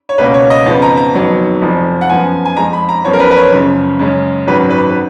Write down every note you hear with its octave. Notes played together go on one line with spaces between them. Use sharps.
C#5
C#2 B2 A#3 C#4 B4
C#5
D#5
F2 C#3 F3 B3
A#5
A#5
F2 D#3 F#3 B3
F1 F2 F3
F#5
F#2 F3 B3 G#5
G#5
F2 F3 G#3 A#5
B5
A#5
F#2 F3 B3 C#5
A#4
B4
B4
C#5
F#1 F#2 C#3 F3
F#2 C#3 G#3 C#4
G#1 F#2 D#3 F#3 B4
B4
B4